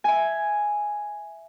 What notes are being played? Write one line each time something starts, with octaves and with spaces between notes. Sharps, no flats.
E5 G#5